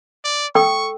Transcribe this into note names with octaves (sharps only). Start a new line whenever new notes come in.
D5
A4 G5 C#6 E6